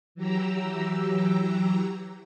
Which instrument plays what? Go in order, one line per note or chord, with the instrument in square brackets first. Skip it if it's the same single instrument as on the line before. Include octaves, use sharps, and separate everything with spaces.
[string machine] E3 F#3 G4 A#5 E6